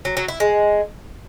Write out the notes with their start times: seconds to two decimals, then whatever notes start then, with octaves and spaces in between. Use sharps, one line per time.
0.05 F#3
0.17 F#3
0.28 E4
0.40 G#3